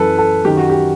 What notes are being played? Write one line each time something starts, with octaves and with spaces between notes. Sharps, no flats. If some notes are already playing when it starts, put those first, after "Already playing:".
Already playing: F#2 E3 A4 B4
A4
F#2 D#3 G4
F#4
G4